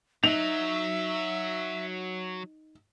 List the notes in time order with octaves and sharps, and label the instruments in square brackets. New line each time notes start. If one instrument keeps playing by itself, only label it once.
[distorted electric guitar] F#3 [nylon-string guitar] D#4 [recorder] E5 [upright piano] F7